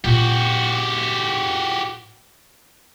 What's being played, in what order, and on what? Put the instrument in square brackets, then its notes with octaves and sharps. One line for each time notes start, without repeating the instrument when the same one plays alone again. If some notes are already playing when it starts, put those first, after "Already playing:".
[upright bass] A#2 C4 [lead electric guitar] F#4 G4